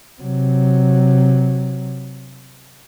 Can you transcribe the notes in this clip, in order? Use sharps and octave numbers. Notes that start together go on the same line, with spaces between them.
C3 F#3